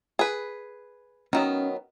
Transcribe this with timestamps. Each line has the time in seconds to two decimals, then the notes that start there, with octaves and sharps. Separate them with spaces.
0.19 G#4 B4
1.33 D#3 F#3 B3 C#4